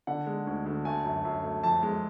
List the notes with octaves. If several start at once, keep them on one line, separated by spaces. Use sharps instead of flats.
D3 F#5
G#3
D2
D2
A3 G#5
F#2
F#2
A3
F2 A5
G#3